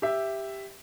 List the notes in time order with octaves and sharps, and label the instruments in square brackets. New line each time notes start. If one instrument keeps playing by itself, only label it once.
[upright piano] G4 E5